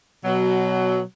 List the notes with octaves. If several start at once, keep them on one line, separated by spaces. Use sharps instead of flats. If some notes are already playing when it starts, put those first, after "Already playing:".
B2 F#3